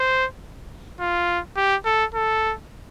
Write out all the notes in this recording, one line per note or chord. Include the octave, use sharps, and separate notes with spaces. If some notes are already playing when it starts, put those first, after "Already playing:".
Already playing: C5
F4
G4
A4
A4